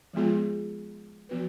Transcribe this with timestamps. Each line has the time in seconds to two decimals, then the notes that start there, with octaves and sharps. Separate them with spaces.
0.13 F3 G#3 B3 F4 G#4
1.29 F3 B3 F#4 B4